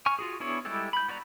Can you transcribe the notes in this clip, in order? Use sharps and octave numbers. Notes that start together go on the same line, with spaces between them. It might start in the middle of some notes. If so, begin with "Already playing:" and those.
G#5 C#6 F6
F4 F#4 G#4
B3 D4 E4 G#4 C#5
G3 G#3 E4 G4 A4
B5 G6
B3 F#4 D5 A#5